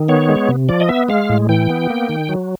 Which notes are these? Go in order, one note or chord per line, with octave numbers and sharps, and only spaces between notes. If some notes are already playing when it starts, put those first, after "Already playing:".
Already playing: D#3
B3 C#5
G#3
C3
F3 D5
D#5
B3 E5
G#3 F5
A2
E3 G5
B3
A#3
D#3
F#3